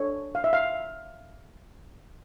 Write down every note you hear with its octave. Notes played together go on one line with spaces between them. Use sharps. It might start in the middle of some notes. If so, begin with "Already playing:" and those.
Already playing: D4 A4 C#5
F5
E5
F5